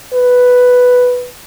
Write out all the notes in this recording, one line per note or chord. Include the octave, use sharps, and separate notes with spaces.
B4